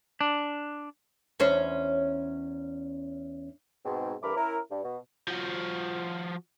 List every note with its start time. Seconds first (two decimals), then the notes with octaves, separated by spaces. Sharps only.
0.21 D4
1.40 E2 C#4 C5
3.85 G#2 B2 C4
4.22 G2 E3 A3 A#4 B5 D6
4.36 C#4 E4 A#4
4.70 G2
4.84 B2
5.28 F3 F#4